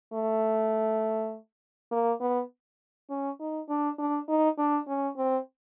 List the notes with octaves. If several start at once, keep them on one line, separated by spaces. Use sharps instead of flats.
A3
A#3
B3
C#4
D#4
D4
D4
D#4
D4
C#4
C4